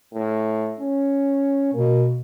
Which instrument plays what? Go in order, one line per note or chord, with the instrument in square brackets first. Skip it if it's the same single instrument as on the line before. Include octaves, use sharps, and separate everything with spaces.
[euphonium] A2
C#4
[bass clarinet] B2 [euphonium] A#3